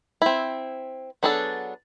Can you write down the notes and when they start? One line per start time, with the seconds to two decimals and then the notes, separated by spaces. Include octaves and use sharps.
0.22 C4 E4
1.23 F#3 B3 D4 G#4 A4